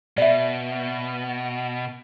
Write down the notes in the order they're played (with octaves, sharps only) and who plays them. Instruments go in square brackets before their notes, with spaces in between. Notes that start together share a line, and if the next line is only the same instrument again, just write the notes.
[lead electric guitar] B2 [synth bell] D5 E5